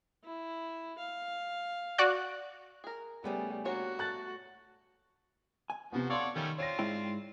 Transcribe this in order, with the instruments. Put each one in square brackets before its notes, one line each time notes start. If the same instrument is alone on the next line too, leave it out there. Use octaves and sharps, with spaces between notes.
[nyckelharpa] E4
F5
[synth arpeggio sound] F#4 D5 F#6
[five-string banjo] G#4 A#4
[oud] C#3 A3 C#4 [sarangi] G3 [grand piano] B3
[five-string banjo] A#3 D4 C#5 [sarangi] F#4
[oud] A3 [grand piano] A5 F#6 A6
[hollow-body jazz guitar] G#5
[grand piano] C3 B3 [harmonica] F3 F#4
[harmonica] A4 C#5 D5 [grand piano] F5 F#5 C6
[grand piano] D#3 [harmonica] G3 A3 C#4
[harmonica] C4 D4 F4 [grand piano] C#5 A#6
[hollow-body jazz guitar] G#2 E4 G5